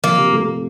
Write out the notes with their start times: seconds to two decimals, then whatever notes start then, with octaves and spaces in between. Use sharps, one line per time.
0.04 F3 A#3
0.18 C3
0.33 A3